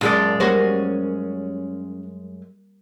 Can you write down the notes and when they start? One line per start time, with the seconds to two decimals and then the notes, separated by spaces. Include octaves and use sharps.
0.01 F#2 A#2 F3 G#3 D5
0.40 G3 A#3 C#4 F#4 C5